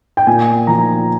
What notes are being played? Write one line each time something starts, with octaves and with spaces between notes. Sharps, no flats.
G5
A#2 G#5
F3 A#5